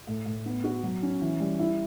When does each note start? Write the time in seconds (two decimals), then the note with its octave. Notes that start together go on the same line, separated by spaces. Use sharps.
0.07 A2
0.26 A2
0.46 B3
0.64 F#4
0.83 F#3
1.02 C#4
1.21 E3
1.40 G3
1.59 E4